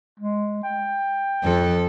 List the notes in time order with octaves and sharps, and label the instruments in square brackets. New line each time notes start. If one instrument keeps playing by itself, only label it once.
[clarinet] G#3
G5
[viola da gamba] F2 A4